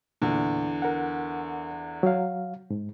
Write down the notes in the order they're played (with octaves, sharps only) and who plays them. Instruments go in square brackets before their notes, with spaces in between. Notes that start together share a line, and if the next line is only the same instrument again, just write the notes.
[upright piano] E2 D3 [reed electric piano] A#2
[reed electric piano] A#4 F#5
F#3 F5
G#2